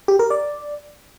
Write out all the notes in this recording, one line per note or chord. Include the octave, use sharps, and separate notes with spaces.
G4
A#4
D5